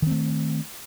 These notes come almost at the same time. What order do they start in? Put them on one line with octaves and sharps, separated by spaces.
D#3 C4 A3